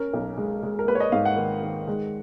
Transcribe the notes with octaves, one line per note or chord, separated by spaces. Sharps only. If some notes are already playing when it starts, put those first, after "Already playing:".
Already playing: C#4 A#4
B1
G#3
G#3
A#4
A#3 B4
C#5
D#5
G#2 F5
F#5
D#3
D#3
G#3